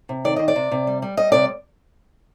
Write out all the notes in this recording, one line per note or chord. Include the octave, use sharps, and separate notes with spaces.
C3
D#3 D5
D#3 D#5
D5
C3
C3
G3
G3
G3 D#5
C3 D5